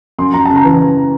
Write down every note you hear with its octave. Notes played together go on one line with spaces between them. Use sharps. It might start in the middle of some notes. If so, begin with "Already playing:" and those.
F#2 C6
F#2 A#5
C#3 A5
A#5
E3